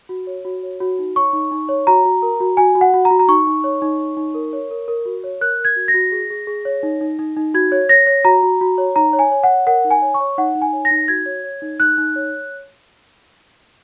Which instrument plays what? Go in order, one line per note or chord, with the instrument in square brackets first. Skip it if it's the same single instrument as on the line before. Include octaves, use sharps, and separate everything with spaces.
[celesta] F#4
C#5
F#4
C#5
F#4
D#4
C#5 C#6
D#4
D#4
C#5
F#4 A#5
F#4
A#4
F#4
F#4 G#5
F#4
F#5
F#4
A#5
F#4
A#5
D#4 C#6
D#4
C#5
D#4
C#5
D#4
A#4
C#5
A#4
A#4
F#4
C#5
A#4 F#6
A#4 G#6
F#4
A#6
F#4
G#4
G#4
G#4
C#5
D#4
D#4
D#4
D#4
F#4 G#6
C#5
C#5 A#6
C#5
F#4 A#5
F#4
F#4
C#5
D#4 A#5
C#5
G#5
C#5
F#5
C#5
A#4 F#5
D#4
G#5
C#5
C#6
C#5
D#4 F#5
D#4
G#5
C#5
A#6
D#4
F#4 G#6
C#5
C#5
D#4
D#4 F#6
D#4
C#5